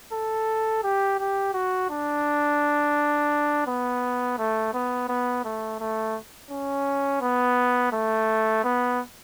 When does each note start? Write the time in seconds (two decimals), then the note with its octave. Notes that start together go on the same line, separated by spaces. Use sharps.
0.13 A4
0.83 G4
1.19 G4
1.54 F#4
1.90 D4
3.67 B3
4.38 A3
4.73 B3
5.09 B3
5.44 A3
5.80 A3
6.51 C#4
7.21 B3
7.92 A3
8.64 B3